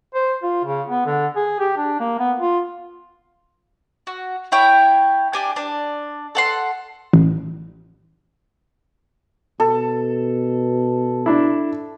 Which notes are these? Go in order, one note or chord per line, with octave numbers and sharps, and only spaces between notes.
C5
F4
C#3
B3
D3
G#4
G4
D4
A#3
B3
F4
F#4
E4 C#5 G5
D4 G4 G#5
D4
A4 F#5 C6
A1
B2 A4
D4 E4